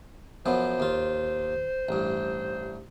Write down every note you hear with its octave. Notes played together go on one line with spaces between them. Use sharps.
F#2 F3 B3 C5
D#2 F4
A1 G2